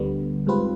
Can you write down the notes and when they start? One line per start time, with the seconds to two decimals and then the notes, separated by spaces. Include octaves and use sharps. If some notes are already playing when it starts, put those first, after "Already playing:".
Already playing: D2 D3 G3 B3
0.47 G#2 G3 C4 F4 B4